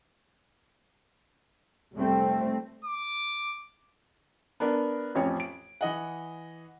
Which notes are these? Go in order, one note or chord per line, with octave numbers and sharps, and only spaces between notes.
F1 G3 A3 C4
D6
B3 D4 A#4
A1 F2 C#4 C#5
D7
E3 D#5 F#5